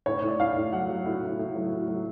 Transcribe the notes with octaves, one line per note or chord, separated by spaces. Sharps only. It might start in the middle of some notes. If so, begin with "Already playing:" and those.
A2 C#5
A2
D5
A2 F5
A2
F#3 F#5
F#3
A2
A2
A2
F#3
A2
F#3